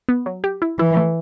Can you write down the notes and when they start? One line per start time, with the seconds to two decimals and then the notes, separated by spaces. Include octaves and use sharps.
0.09 B3
0.26 F#3
0.44 G4
0.62 E4
0.79 E3 E4
0.97 A3